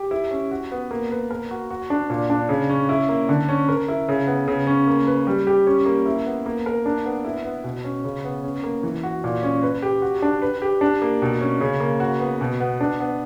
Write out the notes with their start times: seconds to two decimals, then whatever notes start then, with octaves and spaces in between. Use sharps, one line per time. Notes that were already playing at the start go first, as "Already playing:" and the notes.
Already playing: G4
0.11 E4
0.31 C#4
0.51 F#4
0.72 B3
0.91 A#3
1.11 B4
1.31 A#4
1.51 F#4
1.70 F#4
1.90 D4
2.10 A#2
2.30 D4
2.49 C#3
2.70 C#4
2.89 E4
3.09 A#3
3.29 D3
3.49 C#4
3.68 A#4
3.88 E4
4.08 C#3
4.27 B3
4.48 C#3
4.67 C#4
4.88 A#3
5.07 B4
5.27 G3
5.47 G4
5.67 C#4
5.86 A#3
6.06 E4
6.26 B3
6.46 A#3
6.66 A#4
6.86 D4
7.06 B3
7.25 E4
7.45 B3
7.64 B2
7.84 C#4
8.04 C#3
8.24 B3
8.44 C#4
8.63 A#3
8.83 E3
9.03 F#4
9.24 A#2
9.43 C#4
9.63 B4
9.82 G4
10.02 F#4
10.22 D4
10.42 B4
10.62 G4
10.81 D4
11.02 A#3
11.22 B2
11.41 C#4
11.60 C#3
11.80 A#3
12.00 F#4
12.20 B3
12.41 B2
12.60 B3
12.80 D4
13.00 B3